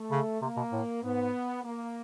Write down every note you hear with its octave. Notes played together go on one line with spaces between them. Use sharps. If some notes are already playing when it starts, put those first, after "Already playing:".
Already playing: A3
C#3
C3 A#3
B2
A2
G#2 B3
A#3